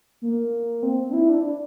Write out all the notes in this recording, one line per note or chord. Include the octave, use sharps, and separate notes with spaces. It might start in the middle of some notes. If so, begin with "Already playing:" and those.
A#3
C4
D4
E4
D4
D4